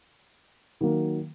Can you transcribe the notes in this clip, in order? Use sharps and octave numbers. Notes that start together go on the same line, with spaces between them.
D#3 F#3 A#3